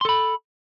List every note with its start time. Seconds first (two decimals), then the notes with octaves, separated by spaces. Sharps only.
0.01 C6
0.05 A4
0.09 B5